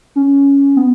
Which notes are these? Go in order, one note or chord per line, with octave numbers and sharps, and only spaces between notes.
C#4
B3